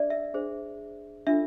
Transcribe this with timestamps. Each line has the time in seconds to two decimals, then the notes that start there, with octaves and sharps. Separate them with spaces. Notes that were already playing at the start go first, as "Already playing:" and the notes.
Already playing: D4 G#4 D5 E5
0.10 E5
0.34 D4 G#4 C5
1.27 D4 F4 A4 E5